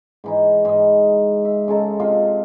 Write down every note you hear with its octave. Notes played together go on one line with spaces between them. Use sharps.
G#2 E3 D#4
G#2 D#5
E5
C#3 G#3 A4 A#5
C3 F4 D#5 F5